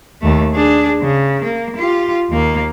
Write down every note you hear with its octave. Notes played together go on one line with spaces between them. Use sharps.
D#2 A3
D4 G#4
C#3
A#3
F4 G4
D#2 A#3